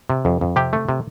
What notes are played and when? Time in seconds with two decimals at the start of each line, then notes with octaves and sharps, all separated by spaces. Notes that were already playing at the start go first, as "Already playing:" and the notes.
0.10 C3
0.25 F2
0.41 F2
0.56 C3 G4
0.73 A3
0.89 C3